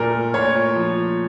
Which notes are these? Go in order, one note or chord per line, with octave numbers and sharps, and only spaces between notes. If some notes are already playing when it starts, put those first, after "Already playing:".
Already playing: A#2 A3 A#4
A#2 C#5
F3